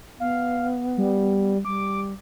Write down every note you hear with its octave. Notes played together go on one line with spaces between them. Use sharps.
B3 F5
G3
G3 D6